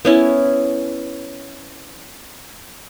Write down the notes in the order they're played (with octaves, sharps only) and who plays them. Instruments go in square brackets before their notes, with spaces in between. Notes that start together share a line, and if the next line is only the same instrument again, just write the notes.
[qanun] B3 C#4 E4